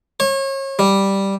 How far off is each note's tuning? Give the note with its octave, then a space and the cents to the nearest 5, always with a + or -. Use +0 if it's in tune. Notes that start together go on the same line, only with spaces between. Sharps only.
C#5 -35
G3 +0